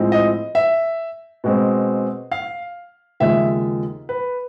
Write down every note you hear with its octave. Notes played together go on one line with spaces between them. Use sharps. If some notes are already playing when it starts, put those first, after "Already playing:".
Already playing: A2 F3 G#3 C4
D#5
E5
B2 G#3 C4
F5
D#2 C#3 F3 G#3 E5
B4